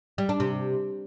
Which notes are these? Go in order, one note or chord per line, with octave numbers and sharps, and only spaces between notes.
G3
D4
C3